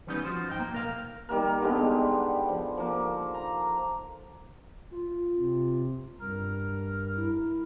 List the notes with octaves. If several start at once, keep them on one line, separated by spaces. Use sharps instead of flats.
E3 G3 B3 C#4 D#4
F3 F4 F#4 C5
G#2 D#4 G5
A#3
B1 A#4 F5
D#3 G3 A#3 A#4
D3 G3 G#3 B3
F3
F3 A#3
A#5
F4
C3
G2 A#4 F6
E4